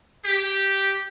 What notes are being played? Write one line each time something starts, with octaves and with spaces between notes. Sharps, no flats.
G4